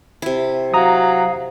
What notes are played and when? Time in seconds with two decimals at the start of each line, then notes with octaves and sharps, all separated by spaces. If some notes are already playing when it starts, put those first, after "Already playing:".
0.22 C3 E4
0.74 F#3 F5 A#5 D#6